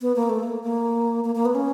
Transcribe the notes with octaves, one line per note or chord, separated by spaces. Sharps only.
B3
A#3
A3
A#3
A#3
A#3
A#3
B3
C#4